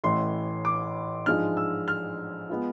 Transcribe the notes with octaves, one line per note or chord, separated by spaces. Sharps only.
A1 A2 E3 C6
D6
G#2 F3 G#3 D4 F4 F6
E6
F6
G#3 B3 F4